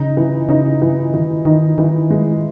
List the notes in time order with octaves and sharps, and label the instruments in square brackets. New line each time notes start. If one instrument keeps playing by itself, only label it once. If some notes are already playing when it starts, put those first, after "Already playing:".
Already playing: [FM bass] C#3 [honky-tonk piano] D#4
[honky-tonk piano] E3
[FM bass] C#3 [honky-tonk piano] D#4
[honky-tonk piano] E3
[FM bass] D#3 [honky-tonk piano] E3
[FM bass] D#3 [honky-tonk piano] D#4
[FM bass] D#3 [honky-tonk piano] E3
[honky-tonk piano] G#3